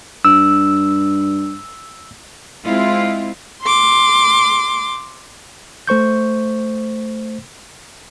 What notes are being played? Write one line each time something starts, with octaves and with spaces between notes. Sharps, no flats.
G2 E6
G#3 C4 E4 F4
C6 D6
A3 C5 C#6 G6